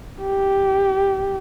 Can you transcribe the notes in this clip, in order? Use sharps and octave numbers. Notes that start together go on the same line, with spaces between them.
G4